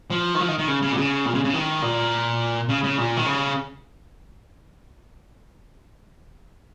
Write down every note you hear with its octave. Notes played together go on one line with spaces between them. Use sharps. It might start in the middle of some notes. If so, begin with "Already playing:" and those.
F3
D#3
F3
D#3
D#3
C#3
C#3
A#2
C#3
A#2
C#3
C#3
D#3
A#2
C#3
C#3
A#2
D#3
C#3